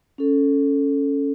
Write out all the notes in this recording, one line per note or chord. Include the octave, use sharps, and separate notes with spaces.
C#4 A4